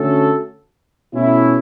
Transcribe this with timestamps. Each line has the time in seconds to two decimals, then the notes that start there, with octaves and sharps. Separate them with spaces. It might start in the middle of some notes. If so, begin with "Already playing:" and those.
Already playing: D3 A3 C#4 F#4 A4
1.13 B2 A3 C#4 E4